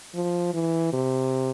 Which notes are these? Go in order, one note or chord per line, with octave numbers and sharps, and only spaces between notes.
F3
E3
C3